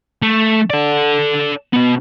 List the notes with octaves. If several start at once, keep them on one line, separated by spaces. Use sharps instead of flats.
A3
A4 D5
B2 B3